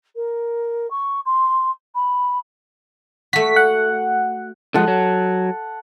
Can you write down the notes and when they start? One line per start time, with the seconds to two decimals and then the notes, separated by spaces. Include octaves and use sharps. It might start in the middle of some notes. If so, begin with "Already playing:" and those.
0.15 A#4
0.90 C#6
1.25 C6
1.95 B5
3.33 A3 F#4 B6
3.56 F#5
4.74 D3 F3 G#3 A4 F#5
4.88 F#3